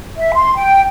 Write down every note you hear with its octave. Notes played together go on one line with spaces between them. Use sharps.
E5
C6
G5